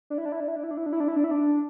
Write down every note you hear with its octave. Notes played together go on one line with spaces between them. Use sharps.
D4
E4
D4
E4
D4
E4
D4
E4
D4
E4
D4
E4
D4
E4
D4
E4
D4